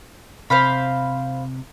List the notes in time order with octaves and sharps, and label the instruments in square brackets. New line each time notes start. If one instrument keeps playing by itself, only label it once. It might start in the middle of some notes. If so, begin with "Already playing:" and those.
[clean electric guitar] C3 [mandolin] C5 F5 B5